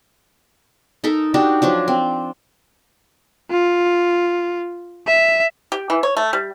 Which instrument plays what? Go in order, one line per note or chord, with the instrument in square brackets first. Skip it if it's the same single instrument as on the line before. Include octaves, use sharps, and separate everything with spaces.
[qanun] D#4 A4 A#4
D4 D#4 F#4 G4
F3 F#3 D4
C4
[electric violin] F4
E5
[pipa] G4
E3
C#5
A3
G3